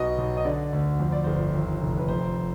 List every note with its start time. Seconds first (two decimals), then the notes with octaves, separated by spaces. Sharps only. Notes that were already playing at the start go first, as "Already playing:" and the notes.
Already playing: B1 B2 D#5
0.18 B1
0.37 D#5
0.45 D3 D5
0.73 D2
1.00 F2 C5
1.12 D5
1.24 G1 C5
1.54 D#2
1.81 F1
1.97 B4
2.08 F2 C5